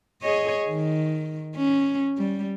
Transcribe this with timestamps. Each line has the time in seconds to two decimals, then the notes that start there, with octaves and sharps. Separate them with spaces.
0.22 G#4 C#5 D#5
0.69 D#3
1.55 C#4
2.18 G3